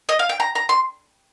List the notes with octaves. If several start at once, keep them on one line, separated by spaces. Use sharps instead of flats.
D#5
F5
G5
A#5
A#5
C6